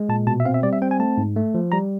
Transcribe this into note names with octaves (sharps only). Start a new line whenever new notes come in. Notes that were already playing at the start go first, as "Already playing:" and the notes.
Already playing: G#3
A#2 A5
B2 A5
E5
C4 F5
E5
G3 D5
E5
C4 G5
G#5
A3 A5
G#2
A3
F3
G3 A#5